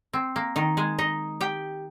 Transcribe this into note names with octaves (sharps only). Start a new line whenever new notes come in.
C4
A#3
D#3 D#4
G#3 G#4
D#4 D#5
G4 G5